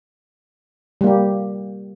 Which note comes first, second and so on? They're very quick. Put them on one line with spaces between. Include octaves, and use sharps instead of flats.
G3 A#3 G4